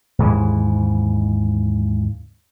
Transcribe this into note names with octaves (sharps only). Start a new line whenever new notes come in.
D#2 G#2 C#3 E3